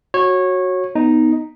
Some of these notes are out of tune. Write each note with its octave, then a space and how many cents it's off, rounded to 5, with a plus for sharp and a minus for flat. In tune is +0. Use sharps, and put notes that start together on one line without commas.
F#4 -5 C#5 -20
B3 +0 D#4 +0